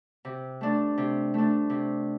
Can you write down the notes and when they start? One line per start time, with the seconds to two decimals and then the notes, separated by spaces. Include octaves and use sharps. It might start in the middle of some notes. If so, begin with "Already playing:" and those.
0.25 C3
0.61 A3 D4
0.98 C3
1.34 A3 D4
1.70 C3